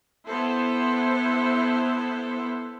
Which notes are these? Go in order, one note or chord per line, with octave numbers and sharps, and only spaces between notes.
B3 E4 A4 C5